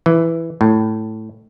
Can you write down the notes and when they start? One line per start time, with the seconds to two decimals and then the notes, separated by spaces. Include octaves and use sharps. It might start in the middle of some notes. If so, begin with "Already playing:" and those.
0.06 E3
0.61 A2